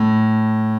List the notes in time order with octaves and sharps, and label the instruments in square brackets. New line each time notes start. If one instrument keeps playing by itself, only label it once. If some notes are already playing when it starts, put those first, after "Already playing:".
Already playing: [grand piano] A2